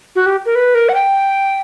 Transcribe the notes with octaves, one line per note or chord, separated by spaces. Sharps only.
F#4
G4
A#4
B4
A#4
F#5
G5